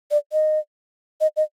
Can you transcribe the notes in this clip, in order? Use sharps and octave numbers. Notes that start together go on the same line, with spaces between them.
D5
D#5
D#5
D#5